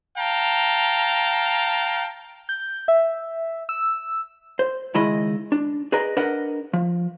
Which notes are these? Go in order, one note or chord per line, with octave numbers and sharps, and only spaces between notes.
F5 G5 A5 A#5
G6
E5
E6
C5
C#2 D#3 G#3 E4 D#5 B5
D4
G#4 B4 D5 D#5 A#5
D4 A#4 B4 D#5 F#5
F3